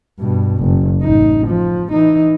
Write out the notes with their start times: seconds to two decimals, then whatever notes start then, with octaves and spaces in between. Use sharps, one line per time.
0.18 G2 B2
0.58 F#1
1.02 A1 D#4
1.47 F3
1.92 E3 D#4